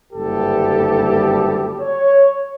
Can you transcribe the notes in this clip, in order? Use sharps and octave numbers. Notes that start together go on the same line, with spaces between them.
F#1 D2 G2 G3 G4 A4
C#5